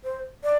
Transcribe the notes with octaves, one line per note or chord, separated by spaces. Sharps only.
C5
D5